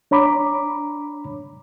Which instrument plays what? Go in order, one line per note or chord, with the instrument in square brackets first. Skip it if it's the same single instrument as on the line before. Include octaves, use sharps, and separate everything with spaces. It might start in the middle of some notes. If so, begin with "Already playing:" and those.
[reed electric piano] D4 C#5 A#5 B5 D6